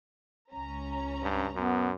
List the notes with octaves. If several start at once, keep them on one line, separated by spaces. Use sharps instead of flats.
C#2 C#4 A#5
G2
F#2 B3